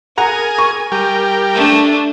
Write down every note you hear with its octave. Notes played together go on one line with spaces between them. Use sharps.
G#4 A#4 F#5 G#5 A#5
C#6
G3 G4 A#4
A3 D4